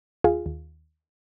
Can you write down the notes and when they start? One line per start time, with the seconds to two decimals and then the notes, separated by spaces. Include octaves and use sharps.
0.24 D#2 F4 G#4
0.46 D#2